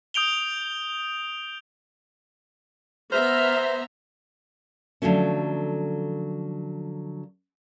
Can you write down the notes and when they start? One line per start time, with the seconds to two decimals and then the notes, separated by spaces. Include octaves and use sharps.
0.14 D#6 G6 D7 F7 G7
3.12 B3 C5 E5 A#5 F6
5.02 D3 F3 F#3 A3 C#4